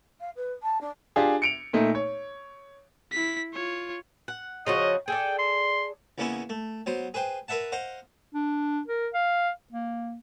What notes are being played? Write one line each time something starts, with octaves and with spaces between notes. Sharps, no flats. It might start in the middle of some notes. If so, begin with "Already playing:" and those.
F5
B4
A5
D4
D4 F4 G4 G#4
C#7 D7 F7
A#2 A3 D#4
C#5
E4 B6
F4 C#5
F#5
C#3 F3 F#4 D#5
G#4 A4 D5 G5
C6
E2 C#3 A#3 B3 C#4 E4
A3
F#3 B3 C5 C6
G#4 B4 C5 G5
A#4 B4 E5 F#5 A5
C5 D#5 F5 F#5
D4
A#4
F5
A#3